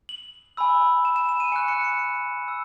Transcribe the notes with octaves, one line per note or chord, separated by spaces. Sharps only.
F#7
G#5 B5 E6
E7
E7
E7
D#7
G#5 C#6 F#6 C#7
C#7
C#7
E6